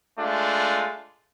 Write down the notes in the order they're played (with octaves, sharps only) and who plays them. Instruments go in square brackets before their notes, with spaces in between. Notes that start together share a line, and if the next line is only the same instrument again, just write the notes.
[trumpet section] G#3 A3 D4 F4